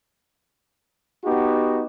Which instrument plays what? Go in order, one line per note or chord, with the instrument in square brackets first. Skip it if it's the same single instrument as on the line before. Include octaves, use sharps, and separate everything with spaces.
[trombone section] B3 D#4 F#4 G4